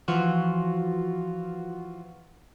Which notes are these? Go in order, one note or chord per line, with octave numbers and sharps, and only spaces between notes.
E3 F3 F4 F#4